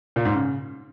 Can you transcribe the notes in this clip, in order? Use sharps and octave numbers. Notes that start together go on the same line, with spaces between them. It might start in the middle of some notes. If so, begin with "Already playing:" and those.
A#2
G#2
C#3